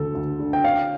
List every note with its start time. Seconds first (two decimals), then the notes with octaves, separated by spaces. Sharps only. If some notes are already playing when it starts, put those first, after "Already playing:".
Already playing: D2 C#3 A3 A4
0.15 D2
0.39 D3
0.53 G5
0.64 C#4 F5